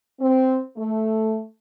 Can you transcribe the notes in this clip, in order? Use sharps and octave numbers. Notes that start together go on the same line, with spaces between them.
C4
A3